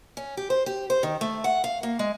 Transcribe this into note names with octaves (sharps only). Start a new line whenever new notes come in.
C#4
G4
C5
G4
C5
D#3
A3
F#5
F5
A#3
G#3